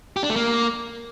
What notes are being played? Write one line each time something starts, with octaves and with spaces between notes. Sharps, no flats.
G4
D4
A3
A#3